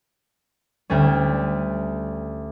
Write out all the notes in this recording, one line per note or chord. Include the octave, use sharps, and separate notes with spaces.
D2 G3 A3 C#4